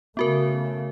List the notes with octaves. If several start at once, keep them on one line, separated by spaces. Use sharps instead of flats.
C#3 A3 B3 F#4 A#4